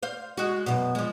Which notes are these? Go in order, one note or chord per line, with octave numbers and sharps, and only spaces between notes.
C5 F5
G#3 F#4
F#2 B2
F3 G#3